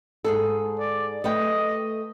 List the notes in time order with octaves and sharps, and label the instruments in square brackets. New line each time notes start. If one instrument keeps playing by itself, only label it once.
[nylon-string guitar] G#2 G#4 A4
[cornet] D5
[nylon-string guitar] A3 B4 G5 [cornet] D#5